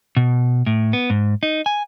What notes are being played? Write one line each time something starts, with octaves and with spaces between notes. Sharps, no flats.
B2
A2
B3
G#2
D#4
G#5